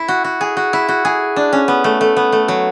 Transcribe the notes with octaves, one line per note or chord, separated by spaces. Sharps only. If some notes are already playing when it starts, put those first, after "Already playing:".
Already playing: E4
F#4
F#4
G#4
F#4
E4
F#4
G#4
D4
C#4
B3
A3
A3
B3
A3
F#3